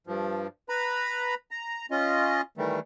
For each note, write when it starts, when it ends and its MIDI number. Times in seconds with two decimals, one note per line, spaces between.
0.07 0.47 43
0.07 0.47 53
0.69 1.35 71
0.69 1.35 82
0.69 1.35 83
1.51 1.86 82
1.91 2.41 61
1.91 2.41 65
1.91 2.41 75
2.58 2.80 51
2.58 2.80 52
2.58 2.80 55
2.58 2.80 57